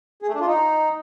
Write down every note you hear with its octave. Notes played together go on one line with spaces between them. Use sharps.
G#4
A3
D4
F4
D#4